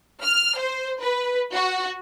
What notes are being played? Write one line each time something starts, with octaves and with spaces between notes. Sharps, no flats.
F6
C5
B4
F#4